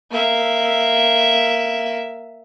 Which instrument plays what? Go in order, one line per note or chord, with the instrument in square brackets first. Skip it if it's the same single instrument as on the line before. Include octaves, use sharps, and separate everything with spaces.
[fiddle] A#3 E5